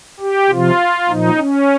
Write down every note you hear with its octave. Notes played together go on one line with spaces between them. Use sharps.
G4
C3 F3 F4
A#2 F3 D#4
C#4